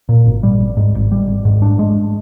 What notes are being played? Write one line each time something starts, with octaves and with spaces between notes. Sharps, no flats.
A#2
G#1
G3
G#1
G#2
G#1
G3
G#1
G#2
D4
G#3